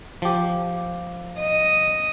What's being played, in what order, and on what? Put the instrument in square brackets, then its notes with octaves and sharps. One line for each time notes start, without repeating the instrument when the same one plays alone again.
[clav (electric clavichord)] F3 G4
[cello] D#5